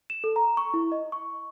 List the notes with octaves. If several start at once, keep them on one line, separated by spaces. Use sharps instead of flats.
E7
A4
A#5
C#6
E4
D#5
C#6